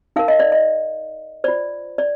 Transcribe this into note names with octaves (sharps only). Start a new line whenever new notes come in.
D#4 A#4 F5
D#5
D5
D#5
F4 C5 D5
D5